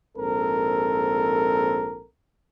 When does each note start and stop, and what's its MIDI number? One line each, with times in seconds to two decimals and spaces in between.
0.18 2.06 34
0.18 2.06 44
0.18 2.06 60
0.18 2.06 69
0.18 2.06 70